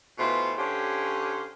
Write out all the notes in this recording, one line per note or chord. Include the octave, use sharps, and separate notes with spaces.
B2 E3 A3 F4 C5
D3 C#4 G4 C5 C#5 F5